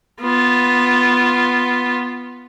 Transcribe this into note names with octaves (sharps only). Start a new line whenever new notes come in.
B3 F4